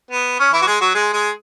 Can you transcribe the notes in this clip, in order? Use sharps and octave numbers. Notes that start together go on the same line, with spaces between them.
B3
C#4
E3 E4
F#4
G#3 G#4
F#3 F#4
G#3 G#4
G#3 G#4